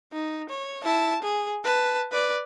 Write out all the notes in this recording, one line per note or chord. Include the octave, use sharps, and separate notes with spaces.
D#4
C#5
E4 A5
G#4
B4 A5
B4 D5